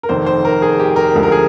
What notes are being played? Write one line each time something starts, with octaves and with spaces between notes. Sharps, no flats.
A#4
F1 F2 D#3 C5
C5
A#4
G#4
G4
A#4
D2 D3 F3 G#3
A#4
G#4